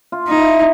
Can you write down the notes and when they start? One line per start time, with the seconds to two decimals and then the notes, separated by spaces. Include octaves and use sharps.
0.12 F4
0.28 D#4
0.36 E4